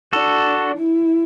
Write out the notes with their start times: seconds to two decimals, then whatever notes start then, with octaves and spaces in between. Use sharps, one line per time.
0.13 D4 F#4 A4
0.78 E4